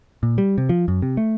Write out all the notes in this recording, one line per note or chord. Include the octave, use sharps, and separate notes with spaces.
A#2
G3
C3
F3
F#2
C3
A3